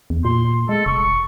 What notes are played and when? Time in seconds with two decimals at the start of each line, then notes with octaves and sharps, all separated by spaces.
0.10 E2
0.25 A#2 C6
0.69 G#3 A4
0.86 F1 C#6